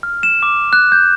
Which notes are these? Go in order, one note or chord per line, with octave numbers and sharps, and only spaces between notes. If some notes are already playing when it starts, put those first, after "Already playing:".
F6
E7
D6
F#6
G6